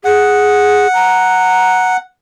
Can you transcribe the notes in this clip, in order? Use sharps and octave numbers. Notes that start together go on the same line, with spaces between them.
G#4 F#5
A#5